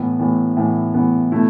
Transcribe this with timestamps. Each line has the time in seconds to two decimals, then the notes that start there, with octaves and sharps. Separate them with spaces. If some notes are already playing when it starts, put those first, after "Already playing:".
Already playing: A2 E3 B3
0.19 A2 E3 B3
0.57 A2 E3 B3
0.94 A2 E3 B3
1.32 B2 A3 E4